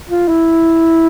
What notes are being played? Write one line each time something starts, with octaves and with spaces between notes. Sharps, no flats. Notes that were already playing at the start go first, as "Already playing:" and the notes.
F4
E4